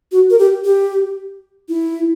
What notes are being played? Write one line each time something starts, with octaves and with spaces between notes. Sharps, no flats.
F#4
A#4
G4
G4
E4